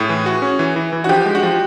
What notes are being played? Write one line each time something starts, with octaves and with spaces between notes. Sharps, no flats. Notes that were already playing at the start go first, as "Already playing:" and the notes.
Already playing: A2 G#4
E3
F#4
C#4
E3
E3
E3
F#4
F3 G4
G#3
F#4
F3